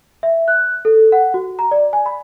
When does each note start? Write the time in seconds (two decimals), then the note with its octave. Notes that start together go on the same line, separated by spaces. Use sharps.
0.23 E5
0.48 F#6
0.85 A4
1.12 F#5
1.34 F#4
1.59 A#5
1.71 D5
1.93 G#5
2.06 B5